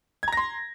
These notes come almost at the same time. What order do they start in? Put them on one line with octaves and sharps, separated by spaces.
G#6 A#5 A#6 C6